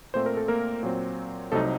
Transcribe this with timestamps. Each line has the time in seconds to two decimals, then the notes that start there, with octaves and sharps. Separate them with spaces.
0.14 A#2 A3 C4 C5
0.26 A#4
0.37 A4
0.48 A#3 A#4
0.83 A#2 F#3 C4
1.52 C2 C3 F#3 A3 C4 D#4 A4